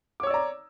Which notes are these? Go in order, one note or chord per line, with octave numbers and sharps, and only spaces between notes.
C#5 D5 A#5 D6 E6